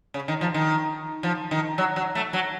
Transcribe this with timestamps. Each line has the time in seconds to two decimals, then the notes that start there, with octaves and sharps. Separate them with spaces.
0.14 C#3
0.28 D#3
0.41 F3
0.54 D#3
1.23 F3
1.51 D#3
1.78 F#3
1.96 F#3
2.15 A3
2.33 F#3